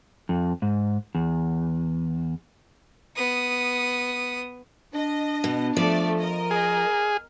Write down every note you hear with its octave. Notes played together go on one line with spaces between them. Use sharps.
F2
G#2
E2
B3 D#6
D4 D#5
B2
F3 A3 D5
A#4 D#5
G#4 F6